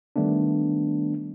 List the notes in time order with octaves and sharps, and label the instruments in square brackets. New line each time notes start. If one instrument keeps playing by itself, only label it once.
[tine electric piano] D#3 G3 A3 B3 D4